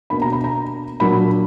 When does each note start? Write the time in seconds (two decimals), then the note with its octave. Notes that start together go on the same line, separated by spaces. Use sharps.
0.10 B2 A#3 D4 B5
0.22 A#5
0.32 B5
0.44 A#5
1.00 A#2 F#3 A#3 D4 B5